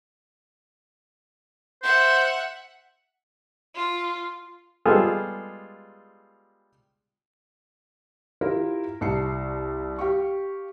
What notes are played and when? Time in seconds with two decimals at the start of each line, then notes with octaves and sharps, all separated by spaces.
1.83 C5 E5 F#5
3.75 F4
4.85 G3 G#3 B3 F4 G#4 A4
8.41 E4 F4 G4 A#4
9.01 C2 A5 C7 C#7
9.99 G4 F5 C#6